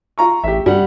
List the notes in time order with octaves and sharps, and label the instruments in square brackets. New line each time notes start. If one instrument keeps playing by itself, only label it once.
[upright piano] F4 A#5 C#6
[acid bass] A1 [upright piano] G4 E5
[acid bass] G2 [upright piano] G3 F#5